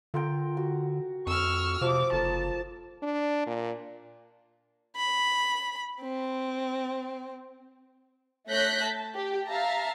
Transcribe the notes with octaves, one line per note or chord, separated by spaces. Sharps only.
D3 F4 A#4 G5
F#4
F2 C#6 E6 F6
C3 F3 D6 D#6
F#1 A4 A#4 A5
D4
A#2
B5
C4
A3 C#5 F#6 G6 A#6 B6
A5
G4
E5 F5 A5 A#5